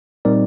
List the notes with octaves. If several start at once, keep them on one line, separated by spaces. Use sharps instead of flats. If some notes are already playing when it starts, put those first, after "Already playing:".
A#2 G3 C4 D#4 A#4 D5